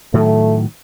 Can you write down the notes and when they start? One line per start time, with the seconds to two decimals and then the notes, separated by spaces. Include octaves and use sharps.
0.14 A2 D#3 F#3 A3